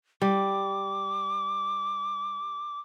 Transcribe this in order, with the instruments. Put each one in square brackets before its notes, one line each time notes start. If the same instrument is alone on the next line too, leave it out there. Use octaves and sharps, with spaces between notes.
[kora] G3 [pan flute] D6